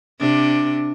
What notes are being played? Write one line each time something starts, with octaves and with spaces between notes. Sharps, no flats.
C3 D4